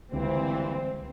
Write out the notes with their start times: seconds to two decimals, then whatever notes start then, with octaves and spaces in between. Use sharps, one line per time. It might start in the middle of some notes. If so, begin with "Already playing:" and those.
0.12 C#2 G2 A#2 D3 E3 G#3 C4